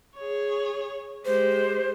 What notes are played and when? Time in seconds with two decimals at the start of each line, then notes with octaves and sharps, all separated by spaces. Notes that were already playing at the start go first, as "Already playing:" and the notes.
0.16 G#4 C#5
1.25 G#3 G4 C5